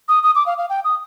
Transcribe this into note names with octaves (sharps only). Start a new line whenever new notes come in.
D#6
D#6
D6
F5
F5
G5
D#6